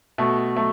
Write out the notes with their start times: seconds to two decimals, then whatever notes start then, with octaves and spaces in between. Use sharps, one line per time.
0.18 B2 A3
0.56 F#3 A3